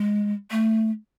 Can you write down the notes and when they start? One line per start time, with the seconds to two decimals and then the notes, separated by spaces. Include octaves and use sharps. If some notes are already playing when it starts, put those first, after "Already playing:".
Already playing: G#3
0.51 A3